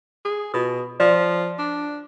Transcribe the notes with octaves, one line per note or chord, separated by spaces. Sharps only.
G#4
B2 F4 D#6
F3 D5
D4